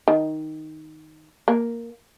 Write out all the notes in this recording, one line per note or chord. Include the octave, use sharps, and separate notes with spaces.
D#3
A#3